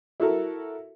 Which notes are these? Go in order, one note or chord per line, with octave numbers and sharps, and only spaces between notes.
E4 F#4 A4 A#4